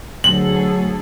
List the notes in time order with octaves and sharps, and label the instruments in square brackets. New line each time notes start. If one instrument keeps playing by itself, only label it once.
[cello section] D2 G#4 A4 [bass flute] F#3 [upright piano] F#7